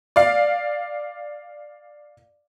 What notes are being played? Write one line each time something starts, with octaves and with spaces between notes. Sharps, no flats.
D5 F5